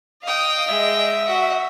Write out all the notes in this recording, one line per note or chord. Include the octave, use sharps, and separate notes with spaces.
D#5 F5 G5 D#6
G#3 E5
F#4 F#5